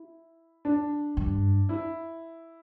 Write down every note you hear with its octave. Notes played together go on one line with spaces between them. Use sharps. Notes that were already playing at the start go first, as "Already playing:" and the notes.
Already playing: E4
D4
G2
E4